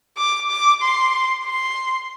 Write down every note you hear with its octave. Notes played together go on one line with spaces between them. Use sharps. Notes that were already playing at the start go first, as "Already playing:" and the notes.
D6
D6
C6
C6